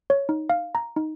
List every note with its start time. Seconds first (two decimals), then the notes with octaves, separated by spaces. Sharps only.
0.10 C#5
0.29 D#4
0.50 F5
0.75 A#5
0.96 D#4